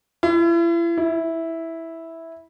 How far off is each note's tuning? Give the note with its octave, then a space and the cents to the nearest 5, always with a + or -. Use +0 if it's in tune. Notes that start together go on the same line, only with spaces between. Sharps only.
E4 +40
E4 -5